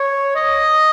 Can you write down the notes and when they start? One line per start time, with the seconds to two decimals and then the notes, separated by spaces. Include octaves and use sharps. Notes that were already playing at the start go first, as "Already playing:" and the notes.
Already playing: C#5
0.36 D#5